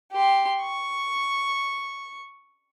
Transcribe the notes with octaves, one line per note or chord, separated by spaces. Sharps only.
G4 C6
C#6